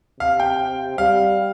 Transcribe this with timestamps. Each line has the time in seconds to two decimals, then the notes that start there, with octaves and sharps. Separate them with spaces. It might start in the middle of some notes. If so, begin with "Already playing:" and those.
0.20 C3 F5
0.40 G5
0.98 G3 F5